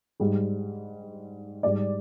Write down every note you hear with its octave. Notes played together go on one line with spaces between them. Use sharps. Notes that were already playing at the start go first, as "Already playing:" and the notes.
G#2 G3
G#2 G3 D5